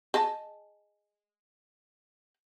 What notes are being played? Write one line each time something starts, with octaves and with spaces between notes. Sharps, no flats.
G#4 D#5 A5